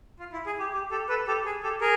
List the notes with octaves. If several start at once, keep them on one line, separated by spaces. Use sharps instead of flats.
F4
E4
G#4
G4
G4
G4 A4
A4 B4
G4 A4
G#4
G4 A4
G#4 A#4